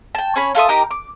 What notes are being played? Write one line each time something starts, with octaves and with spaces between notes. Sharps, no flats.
G5 A5
C#4 C#5 B5
F4 A4 E5 D#6
D#4 G4 A#4
D6